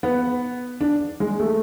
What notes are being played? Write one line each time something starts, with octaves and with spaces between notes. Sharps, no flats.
B3
D4
G#3
A3